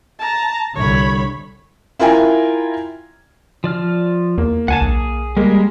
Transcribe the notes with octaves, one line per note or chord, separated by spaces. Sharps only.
A5 A#5
C2 D3 C#5 B5
E4 F4 A#4 G5 G#5 A#5
F3 D5 F6
E2 A#3
D2 F#5 G#5 A5
B1 G#4
G3 G#3 A#3 A#4